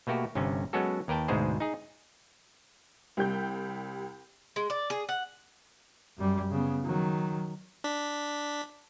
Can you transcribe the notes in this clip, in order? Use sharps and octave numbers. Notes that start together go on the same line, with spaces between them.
B2 A3 A#3 F#4 G4
G1 G2 C3 C#4
F#3 G#3 B3 C#4 F#4 A4
D#2 A#4 B4 G5 A5
D2 G#2 B2 G#3 G#4 C5
D#4 G#4
C2 G3 G5 G6
G#3
D5
G#4
F#5
F#2 G3
C#3 B3
D#3 F#3
D4 B6